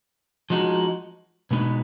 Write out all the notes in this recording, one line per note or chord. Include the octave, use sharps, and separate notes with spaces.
F3 G#3 D#4 F#4
B2 G#3 B3 D#4